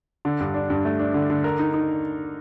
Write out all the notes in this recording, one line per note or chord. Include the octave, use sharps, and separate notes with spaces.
D3
G2
D4
G2
A3
D4
D3
D3
A#4
D#4
D#4